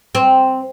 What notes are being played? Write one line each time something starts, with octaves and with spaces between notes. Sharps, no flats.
C4